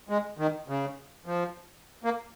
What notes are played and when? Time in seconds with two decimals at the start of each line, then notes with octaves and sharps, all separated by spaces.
0.09 G#3
0.38 D#3
0.68 C#3
1.26 F3
2.04 A#3